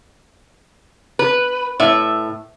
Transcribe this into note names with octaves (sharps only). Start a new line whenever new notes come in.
B4
A2 E5